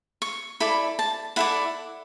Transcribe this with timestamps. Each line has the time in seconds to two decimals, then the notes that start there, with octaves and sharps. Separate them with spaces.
0.22 C#6
0.60 E4 A4 D5 B5
0.99 A5
1.36 E4 A4 D5 F#5